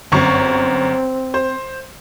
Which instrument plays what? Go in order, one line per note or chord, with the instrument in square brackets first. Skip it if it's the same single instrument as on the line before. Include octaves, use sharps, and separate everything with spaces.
[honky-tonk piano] G1 F#2 C#6 [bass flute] C4
[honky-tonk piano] C5